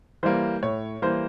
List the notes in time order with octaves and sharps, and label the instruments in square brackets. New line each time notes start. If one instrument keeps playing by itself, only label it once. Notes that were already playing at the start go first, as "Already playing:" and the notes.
[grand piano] E3 G3 A#3 C5
A2 C#5
E3 G3 A#3 C5